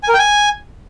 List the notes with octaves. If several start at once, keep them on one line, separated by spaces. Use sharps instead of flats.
G#5
A#4
G5
G#5